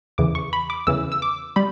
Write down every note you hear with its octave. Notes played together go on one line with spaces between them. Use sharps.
E2 C#3 E3 D6
C#6
B5
D6
E2 C#3 E3 E6
E6
D6
G3 B5